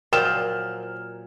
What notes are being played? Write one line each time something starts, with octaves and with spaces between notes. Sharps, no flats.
A#2 F3 F#3 A#4 G5 F6 E7